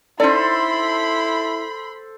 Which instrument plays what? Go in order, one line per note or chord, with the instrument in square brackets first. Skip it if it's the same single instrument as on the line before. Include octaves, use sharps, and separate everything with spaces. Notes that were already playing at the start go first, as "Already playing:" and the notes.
[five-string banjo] C#4 D#4 D5 [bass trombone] E4 [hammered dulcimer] A4 C5 [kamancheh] B5 C6